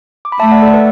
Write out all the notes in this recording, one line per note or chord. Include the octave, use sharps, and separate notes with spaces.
D6
B5
A3 E5 A5
D5 F#5
A4 D5
B4 E5